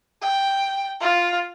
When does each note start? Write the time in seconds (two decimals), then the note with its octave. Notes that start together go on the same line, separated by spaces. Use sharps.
0.22 G5
1.01 F4